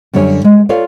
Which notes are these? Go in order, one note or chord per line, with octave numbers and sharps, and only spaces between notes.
F#2 D3 G3 C#5 G#5
G#3
F4 A4 C#5 D5 F5